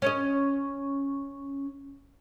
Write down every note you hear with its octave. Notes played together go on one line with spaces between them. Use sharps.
C#4 C#5 D#5